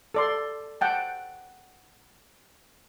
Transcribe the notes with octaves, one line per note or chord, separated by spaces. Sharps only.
A4 D5 C6
F#5 G5 A5